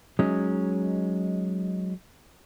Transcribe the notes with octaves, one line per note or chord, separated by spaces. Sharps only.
F#3 G#3 C#4 D#4